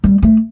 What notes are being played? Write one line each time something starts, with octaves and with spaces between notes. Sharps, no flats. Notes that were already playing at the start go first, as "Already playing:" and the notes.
G3
A3